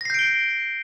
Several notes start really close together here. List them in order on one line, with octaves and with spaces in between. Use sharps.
A#6 C7 G6 D7 G7